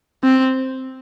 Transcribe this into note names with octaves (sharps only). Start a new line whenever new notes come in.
C4